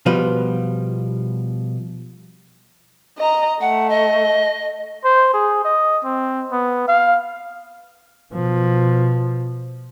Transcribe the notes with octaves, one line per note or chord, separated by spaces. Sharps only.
B2 F3 G3 F4 B4
D#5 A#5
A3 F#5
D#5
C5
G#4
D#5
C4
B3
F5
B2 F3